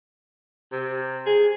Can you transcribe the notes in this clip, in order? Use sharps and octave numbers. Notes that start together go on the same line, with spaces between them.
C3
G#4